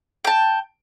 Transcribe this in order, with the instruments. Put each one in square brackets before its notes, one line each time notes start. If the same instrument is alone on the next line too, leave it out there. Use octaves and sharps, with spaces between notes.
[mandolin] G5 A5